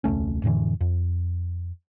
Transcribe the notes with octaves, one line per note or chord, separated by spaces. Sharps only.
E1 C#2 A3 C#4
F2 A2 D3 E3
F2